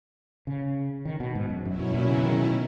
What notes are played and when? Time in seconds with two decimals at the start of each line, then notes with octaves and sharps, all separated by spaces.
0.47 C#3
1.05 D#3
1.20 B2
1.35 G#2
1.50 F#2
1.64 F#2 B2 F#3 C#4 E4
1.79 F#2
1.94 A#2
2.09 C#3
2.23 D#3